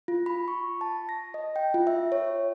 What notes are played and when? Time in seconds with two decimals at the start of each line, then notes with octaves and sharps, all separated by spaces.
0.08 F4
0.26 B5
0.48 C#6
0.81 A5
1.09 A#6
1.34 D#5
1.56 G5
1.74 F4
1.87 E5
2.12 C#5